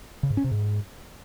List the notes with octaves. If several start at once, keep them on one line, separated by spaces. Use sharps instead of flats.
C#3
G#2
C#4
C3
G#2